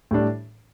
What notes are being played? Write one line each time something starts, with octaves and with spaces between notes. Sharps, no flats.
A2 G3 D4